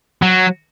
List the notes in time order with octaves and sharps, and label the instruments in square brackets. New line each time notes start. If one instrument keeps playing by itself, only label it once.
[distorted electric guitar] F#3